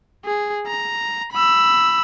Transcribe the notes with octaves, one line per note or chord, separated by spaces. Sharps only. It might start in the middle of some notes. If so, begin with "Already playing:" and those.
G#4
A#5
B5 E6